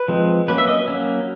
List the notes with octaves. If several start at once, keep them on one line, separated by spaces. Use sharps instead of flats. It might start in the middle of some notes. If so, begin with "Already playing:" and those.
Already playing: B4
F3 G#3 C4
F#3 A#3 C#4 B4
E5
D#5
F#3 A#3 C#4